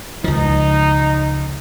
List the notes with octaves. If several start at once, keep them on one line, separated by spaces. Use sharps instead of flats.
C#2 F3 D#4